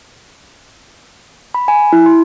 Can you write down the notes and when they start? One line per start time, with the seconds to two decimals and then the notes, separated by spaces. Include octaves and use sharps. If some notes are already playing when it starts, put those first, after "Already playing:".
1.54 B5
1.68 G#5
1.93 E4
2.06 C6